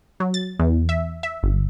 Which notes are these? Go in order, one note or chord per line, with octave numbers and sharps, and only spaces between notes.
F#3
A6
E2
E5
E5
G1